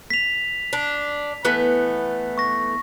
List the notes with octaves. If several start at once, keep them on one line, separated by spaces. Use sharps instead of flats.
B6 F7
D4
E3 A3 B3
C#6 A#6